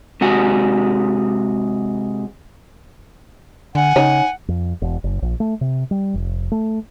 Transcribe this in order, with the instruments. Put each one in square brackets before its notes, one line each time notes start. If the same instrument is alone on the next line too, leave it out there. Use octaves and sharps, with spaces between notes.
[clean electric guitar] C3 G#3 F#4 G#4
[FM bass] D3 [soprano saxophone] F#5 [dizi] G#5
[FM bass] C#3 [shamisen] D#4 C#5
[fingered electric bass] F2
E1
F#1
A#1
A3
C3
G3
F1
A3